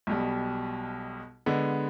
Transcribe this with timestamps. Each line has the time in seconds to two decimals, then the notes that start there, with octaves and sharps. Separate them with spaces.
0.07 B1 B2 G3
1.46 D3 G#3 B3